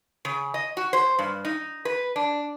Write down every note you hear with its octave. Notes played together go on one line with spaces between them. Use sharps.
C#3
D#5
F#4
C5
G2
D#4
B4
D4